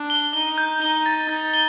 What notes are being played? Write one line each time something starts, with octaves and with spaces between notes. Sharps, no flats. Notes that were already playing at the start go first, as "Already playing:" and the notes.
Already playing: D4
G7
D#4 G7
G6
D#4 G7
A6
D#4 A6
G7